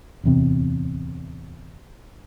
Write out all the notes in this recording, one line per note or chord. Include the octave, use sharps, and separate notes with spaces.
D1 E2 C3